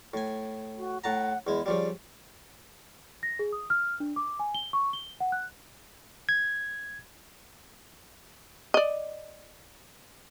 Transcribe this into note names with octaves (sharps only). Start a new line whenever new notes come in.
A2 G#5
F#4
A2 F#5 A5 A#5
E2 G#3 E4
C#3 F3 G3 D5
A#6
G#4
D#6
F6
D4
D6
G#5
G7
C#6
G7
F#5
F#6
G#6
D5 D#5